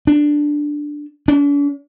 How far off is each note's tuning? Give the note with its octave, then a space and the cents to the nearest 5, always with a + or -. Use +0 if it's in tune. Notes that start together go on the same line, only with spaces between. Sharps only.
D4 +5
D4 -45